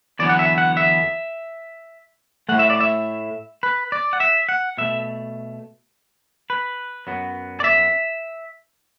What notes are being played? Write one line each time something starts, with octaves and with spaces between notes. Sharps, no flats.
E2 D3 F#3 B3 D5
F#5
E5
F#5
E5
A2 A3 F#5
E5
D5
E5
B4
D5
F#5
E5
F#5
B2 A3 E5
B4
F#2 F#3 B3
D5
E5